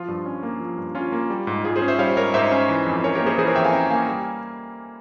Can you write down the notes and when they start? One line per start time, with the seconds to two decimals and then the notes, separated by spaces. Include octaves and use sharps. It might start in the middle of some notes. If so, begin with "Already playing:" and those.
Already playing: F3 F4
0.08 G2
0.26 C#4
0.43 A#3
0.60 F3
0.78 G2
0.95 C#4 F4
1.12 A#3
1.30 G3
1.47 G#2
1.64 G#2 F4 G#4
1.76 G#4 C5
1.82 C#4
1.88 C5 E5
1.99 G3 C#5 F5
2.17 G#2 A#4 C#5
2.34 G#2 C5 E5
2.51 C#4
2.69 E3
2.86 F2
3.04 C#4 A#4 C#5
3.15 G4 A#4
3.21 A#3
3.26 G#4 C5
3.38 E3 G#4 C5
3.47 A#4 C#5
3.55 F2 E5 G5
3.64 F5 G#5
3.73 C#4 G5 A#5
3.90 A#3 F5 G#5
4.08 G3